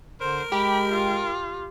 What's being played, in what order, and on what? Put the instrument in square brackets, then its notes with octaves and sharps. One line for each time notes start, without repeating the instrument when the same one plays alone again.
[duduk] D3 [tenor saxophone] A#4 [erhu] C5
[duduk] G#3 [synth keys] G4 [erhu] B5
[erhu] F4